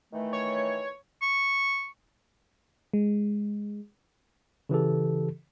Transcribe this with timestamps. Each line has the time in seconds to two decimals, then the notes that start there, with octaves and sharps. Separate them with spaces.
0.12 D#3 E3 A3
0.33 C#5
1.22 C#6
2.93 G#3
4.69 C#3 E3 G4 A4